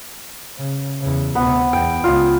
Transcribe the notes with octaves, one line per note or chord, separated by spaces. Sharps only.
C#3
E2 C#3
D2 C3 B3
E2 G5
C#2 F4 D#5